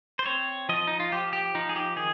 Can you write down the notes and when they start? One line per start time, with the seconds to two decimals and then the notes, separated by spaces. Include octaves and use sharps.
0.19 C5
0.26 C4 C#5
0.69 F3 D#5
0.87 D#4
1.00 F4
1.12 F3 G4
1.33 G4
1.55 F3 D#4
1.69 G#4
1.76 G4
1.96 D#3 G#4